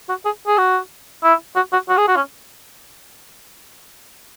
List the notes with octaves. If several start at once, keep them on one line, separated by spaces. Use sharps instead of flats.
F#4
G#4
G#4
F#4
E4
F#4
F#4
F#4
G#4
F#4
C#4